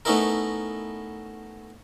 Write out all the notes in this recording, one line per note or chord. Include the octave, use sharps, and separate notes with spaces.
A3 B3 C#4 D#4 E4 A#4